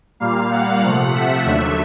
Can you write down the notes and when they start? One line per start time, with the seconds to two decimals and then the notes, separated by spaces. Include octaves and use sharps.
0.20 A#2 G3 A#3 F5
0.52 F#5
0.83 C3 F3 A3
1.13 E5
1.45 D#2 D3 F#3 A3